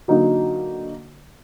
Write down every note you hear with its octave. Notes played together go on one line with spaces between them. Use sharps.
D3 F#3 A#3 D#4 F#4